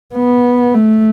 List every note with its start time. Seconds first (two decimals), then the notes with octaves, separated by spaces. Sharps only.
0.15 B3
0.74 A3